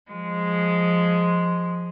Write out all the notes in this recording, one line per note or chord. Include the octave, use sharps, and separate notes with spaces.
F3 G#3